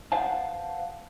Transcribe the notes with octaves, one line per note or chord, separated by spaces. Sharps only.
B4 C5 F5 F#5 A5